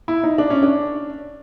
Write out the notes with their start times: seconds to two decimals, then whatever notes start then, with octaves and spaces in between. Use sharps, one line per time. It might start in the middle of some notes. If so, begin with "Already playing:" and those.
0.08 E4
0.24 D#4
0.38 D4
0.50 C#4
0.63 D4